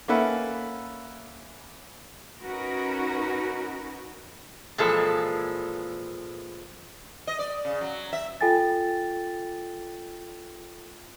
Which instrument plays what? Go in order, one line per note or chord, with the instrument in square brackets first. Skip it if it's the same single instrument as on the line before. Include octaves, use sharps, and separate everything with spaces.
[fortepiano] A#3 C#4 A4 B4 E5 F#5
[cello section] C#4 D#4 F#4 A#4 B4
[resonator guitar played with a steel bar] A#2 E3 F3 G#3 A4
[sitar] D#5
D5
C#3
F#3
E5
[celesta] F4 A4 G5 G#5 A6